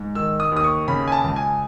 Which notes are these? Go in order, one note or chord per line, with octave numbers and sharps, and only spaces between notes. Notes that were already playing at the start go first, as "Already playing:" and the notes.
Already playing: G#2
D#3 E6
D#6
D#2 D#6
C#6
C#3 B5
G#5
A5
C#2
G#5